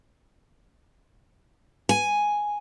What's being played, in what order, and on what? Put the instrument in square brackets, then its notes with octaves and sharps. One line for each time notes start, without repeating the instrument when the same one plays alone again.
[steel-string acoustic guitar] G#5